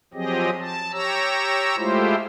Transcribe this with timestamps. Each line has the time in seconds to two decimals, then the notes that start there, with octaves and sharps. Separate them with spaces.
0.14 F3 F#3 C4 G4 G#4 D#5
0.59 A5
0.92 G4 C#5 A#5 E6
1.77 G#3 A3 E4 F4 G4 C5